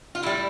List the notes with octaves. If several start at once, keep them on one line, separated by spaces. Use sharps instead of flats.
F4
A2 G3 E4